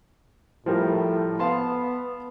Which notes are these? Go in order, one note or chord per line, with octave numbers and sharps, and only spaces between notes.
A2 F3 G3 A#4
B3 F5 A5 C6